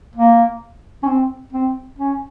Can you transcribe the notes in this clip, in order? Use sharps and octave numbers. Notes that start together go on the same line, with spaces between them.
A#3
C#4
C4
C4
C#4